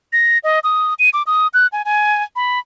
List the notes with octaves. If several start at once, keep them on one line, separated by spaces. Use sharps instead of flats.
A#6
D#5
D#6
D#7
D6
D#6
F#6
G#5
G#5
B5